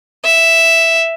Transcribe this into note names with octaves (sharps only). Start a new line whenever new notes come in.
E5